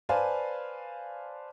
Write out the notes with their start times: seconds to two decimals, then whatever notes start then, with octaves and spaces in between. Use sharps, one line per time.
0.09 B4 C5 D5 F5 G#5 A5